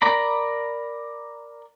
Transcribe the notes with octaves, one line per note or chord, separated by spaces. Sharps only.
A#4 D5 A#5 B5